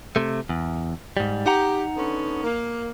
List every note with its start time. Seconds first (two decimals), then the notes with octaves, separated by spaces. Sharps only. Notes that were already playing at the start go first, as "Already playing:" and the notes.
0.16 C3 A3
0.49 E2
1.17 G#2 G3
1.46 D#4 G4 F#5 A#5
1.97 D3 B3 C#4
2.43 A#3